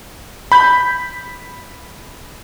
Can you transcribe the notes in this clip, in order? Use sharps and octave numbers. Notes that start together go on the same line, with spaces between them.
B5 G6